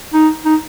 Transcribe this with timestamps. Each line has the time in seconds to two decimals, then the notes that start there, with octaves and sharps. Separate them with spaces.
0.13 D#4
0.45 D#4